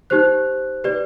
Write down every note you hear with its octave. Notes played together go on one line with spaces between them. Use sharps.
D#4 G4 C5 F#6
G4 B4 D5